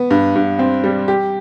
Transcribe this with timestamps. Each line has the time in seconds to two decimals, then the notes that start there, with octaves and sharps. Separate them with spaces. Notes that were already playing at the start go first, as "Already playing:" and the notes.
Already playing: B3
0.11 G2
0.36 G2
0.59 C4
0.84 G3
1.08 G4